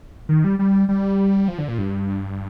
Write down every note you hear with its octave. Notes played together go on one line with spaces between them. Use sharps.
D#3
G3
G3
G3
F3
D3
A#2
G2